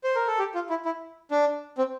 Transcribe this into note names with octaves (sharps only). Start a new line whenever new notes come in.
C5
A#4
A4
G4
F4
E4
E4
D4
C4